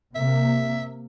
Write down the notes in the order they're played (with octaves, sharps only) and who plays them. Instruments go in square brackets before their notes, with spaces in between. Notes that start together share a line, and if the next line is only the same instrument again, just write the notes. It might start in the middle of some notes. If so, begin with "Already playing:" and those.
[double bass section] C3 A#3 [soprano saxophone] E5